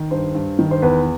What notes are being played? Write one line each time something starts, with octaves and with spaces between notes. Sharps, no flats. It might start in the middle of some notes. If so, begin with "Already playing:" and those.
Already playing: D#3
G2 C5
G2
D#3
C5
E2 B4